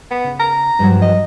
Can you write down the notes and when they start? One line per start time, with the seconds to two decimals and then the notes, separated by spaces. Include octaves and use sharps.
0.11 B3
0.24 C#3
0.40 A#5
0.79 G2 F3 F#3
1.02 D#5